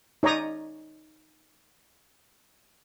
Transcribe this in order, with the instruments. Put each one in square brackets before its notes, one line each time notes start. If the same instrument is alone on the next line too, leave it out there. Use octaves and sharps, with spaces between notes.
[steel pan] D#4 C#5 D5 A#5 D#6